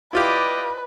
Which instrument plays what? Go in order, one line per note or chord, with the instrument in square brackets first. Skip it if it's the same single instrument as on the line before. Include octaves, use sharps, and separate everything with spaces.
[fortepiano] E4 F4 G4 [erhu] B4 [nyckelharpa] D5 D#5